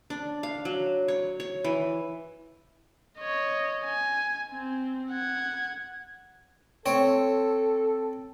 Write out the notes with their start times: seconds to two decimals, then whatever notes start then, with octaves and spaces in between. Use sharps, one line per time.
0.10 D4
0.43 F5
0.65 F#3
1.08 C#5
1.40 C#5
1.64 E3
3.18 C#5 D#5
3.85 G#5
4.51 C4
5.11 F#5 G#6
6.86 C4 A4 C#5